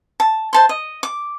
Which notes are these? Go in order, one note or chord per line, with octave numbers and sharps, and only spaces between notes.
A5
C5 A5 C6
D#5
D6